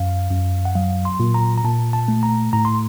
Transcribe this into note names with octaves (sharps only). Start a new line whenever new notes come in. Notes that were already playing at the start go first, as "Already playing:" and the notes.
Already playing: F#2 F5
F#2
F#5
F#3 F5
C6
A#2
A#5
A#5
A#2 A5
A5
A3
A#5
A2 A#5
C6